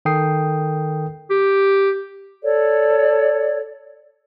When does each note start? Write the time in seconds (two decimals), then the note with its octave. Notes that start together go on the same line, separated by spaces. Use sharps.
0.05 D#3 A4 A#4 G5 D#6 C7
1.31 G4
2.43 A4 C#5 D5